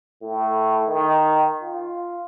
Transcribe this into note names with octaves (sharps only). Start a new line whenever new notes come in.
A2
D#3
F4